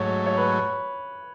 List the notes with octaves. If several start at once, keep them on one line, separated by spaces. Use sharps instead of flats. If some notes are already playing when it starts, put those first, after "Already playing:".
Already playing: G#2 F#3 A3 C#5
C#5
B4